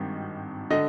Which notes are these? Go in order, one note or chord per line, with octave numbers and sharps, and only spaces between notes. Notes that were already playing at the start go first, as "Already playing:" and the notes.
Already playing: G#1 G2 D#3
D3 D#5